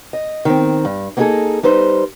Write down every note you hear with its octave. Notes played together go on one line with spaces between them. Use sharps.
D#5
D#3 C4
G2
A#3 B3 D#4 E4 G#4 A4
G3 D#4 B4 C5